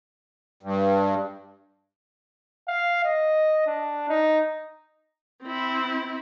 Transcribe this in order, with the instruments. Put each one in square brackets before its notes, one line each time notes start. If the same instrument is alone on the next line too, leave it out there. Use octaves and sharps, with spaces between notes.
[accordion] G2
[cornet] F5
D#5
D4
D#4
[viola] C4 E4